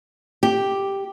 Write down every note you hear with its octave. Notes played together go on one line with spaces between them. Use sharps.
G4